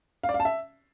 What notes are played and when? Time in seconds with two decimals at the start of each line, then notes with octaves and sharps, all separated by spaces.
0.23 F5
0.29 D5
0.34 F5
0.40 A5
0.45 E5